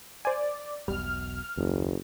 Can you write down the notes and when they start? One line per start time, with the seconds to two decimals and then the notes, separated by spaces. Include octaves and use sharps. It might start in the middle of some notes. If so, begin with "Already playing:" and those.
0.25 C5 D5 G#5
0.88 E1 B1 B2 G3 F6
1.57 F#1 D#2